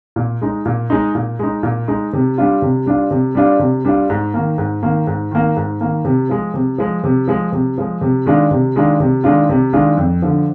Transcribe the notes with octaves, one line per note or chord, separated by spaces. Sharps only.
A#2
G#3 D#4
A#2
G#3 D#4
A#2
G#3 D#4
A#2
G#3 D#4
C3
G3 D4 F4
C3
G3 D4 F4
C3
G3 D4 F4
C3
G3 D4 F4
G#2
D#3 A#3
G#2
D#3 A#3
G#2
D#3 A#3
G#2
D#3 A#3
C3
F3 G#3
C3
F3 G#3
C3
F3 G#3
C3
F3 G#3
C3
D#3 G#3 D4 F4
C3
D#3 G#3 D4 F4
C3
D#3 G#3 D4 F4
C3
D#3 G#3 D4 F4
F2
D3 F3